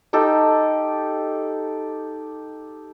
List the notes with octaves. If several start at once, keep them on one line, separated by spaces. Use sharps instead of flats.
D#4 G4 A4